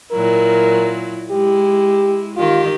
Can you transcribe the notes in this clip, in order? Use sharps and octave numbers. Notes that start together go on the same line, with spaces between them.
A#2 F#3 E4 A#4
G#3 E4 G4
D#3 F4 G4